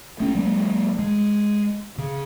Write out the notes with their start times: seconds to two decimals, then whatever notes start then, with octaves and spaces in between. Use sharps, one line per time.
0.20 A3 C#4
0.35 F#3 G#3 A#3
0.99 G#3
1.98 C#3